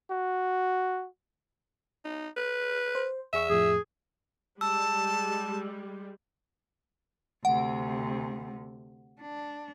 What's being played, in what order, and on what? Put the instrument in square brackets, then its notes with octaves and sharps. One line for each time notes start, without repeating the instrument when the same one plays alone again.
[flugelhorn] F#4
[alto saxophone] D#4
B4
[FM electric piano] C5
[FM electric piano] E2 G#4 C#6 [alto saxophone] E5
[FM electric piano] F2 A2 F3 [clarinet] G#4
[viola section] G3 G#3 [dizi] A5 [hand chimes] E6
[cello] D2 C3 [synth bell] F#5
[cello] D4